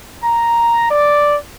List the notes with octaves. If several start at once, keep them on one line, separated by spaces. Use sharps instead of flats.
A#5
D5